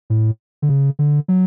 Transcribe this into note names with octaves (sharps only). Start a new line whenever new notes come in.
A2
D3
C#3
D3
F#3